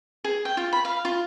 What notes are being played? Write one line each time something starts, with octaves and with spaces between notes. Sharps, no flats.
G#4
G5
F4
B5
F5
F4